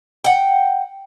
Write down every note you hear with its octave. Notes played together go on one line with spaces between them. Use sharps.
F#5 G5